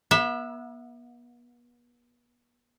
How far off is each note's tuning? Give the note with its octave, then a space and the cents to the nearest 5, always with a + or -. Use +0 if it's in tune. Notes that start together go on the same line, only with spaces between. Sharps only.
B3 -40 E5 +0